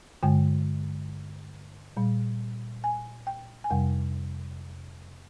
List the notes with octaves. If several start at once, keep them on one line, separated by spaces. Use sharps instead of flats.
G2 D3 G#3 G5
A#2 G3
G#5
G5
G#5
F2 C3 G3 G5